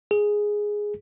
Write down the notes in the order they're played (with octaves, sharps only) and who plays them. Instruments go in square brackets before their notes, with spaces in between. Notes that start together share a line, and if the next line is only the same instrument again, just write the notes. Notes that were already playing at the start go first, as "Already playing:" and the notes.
[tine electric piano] G#4